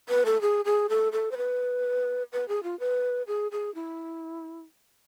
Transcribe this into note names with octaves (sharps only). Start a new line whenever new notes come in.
B4
A4
G#4
G#4
A4
A4
C5
B4
B4
G#4
F4
B4
G#4
G#4
E4